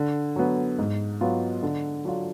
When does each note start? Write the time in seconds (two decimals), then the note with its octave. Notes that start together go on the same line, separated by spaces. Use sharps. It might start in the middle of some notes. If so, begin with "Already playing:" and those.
Already playing: D3
0.36 F#3 B3
0.79 G#2
1.21 F#3 B3 F4
1.63 D3
2.05 F#3 D4 F4